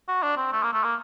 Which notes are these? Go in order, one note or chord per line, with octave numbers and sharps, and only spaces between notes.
F#4
D4
C4
A3
A#3
A3
A#3